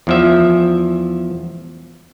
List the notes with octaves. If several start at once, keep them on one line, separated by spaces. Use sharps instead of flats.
E2 F3 E5